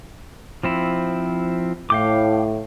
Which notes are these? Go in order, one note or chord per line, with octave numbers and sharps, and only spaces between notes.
F3 C4 E4
A2 F5 G5 D6